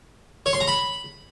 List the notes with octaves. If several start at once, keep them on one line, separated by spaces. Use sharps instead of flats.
C#5
C6
A#5
B5